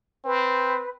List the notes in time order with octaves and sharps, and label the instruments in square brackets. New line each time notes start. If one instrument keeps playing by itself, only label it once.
[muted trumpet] C4 [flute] B4